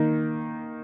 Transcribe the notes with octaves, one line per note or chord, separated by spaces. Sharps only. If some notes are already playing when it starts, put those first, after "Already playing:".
Already playing: D#3 A#3 D#4